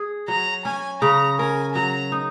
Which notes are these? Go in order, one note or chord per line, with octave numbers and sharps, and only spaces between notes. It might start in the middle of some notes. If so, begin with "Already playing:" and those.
Already playing: G#4
F#3 A#5
C#4 G#5
C#3 A#5
A#4 G#5
F#3 A#5
D#4